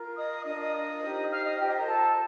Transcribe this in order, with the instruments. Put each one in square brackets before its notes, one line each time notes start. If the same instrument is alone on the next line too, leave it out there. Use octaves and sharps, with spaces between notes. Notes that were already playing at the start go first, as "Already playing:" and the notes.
Already playing: [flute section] F4 A#4
D#5 D#6
D4 F4 A#4 D#5 D#6
D#5 D#6
D#4 G4 C5
F5 F6
D#5 D#6
F4 G4 C5 G5
D#5
A#4 A#5
A4 A5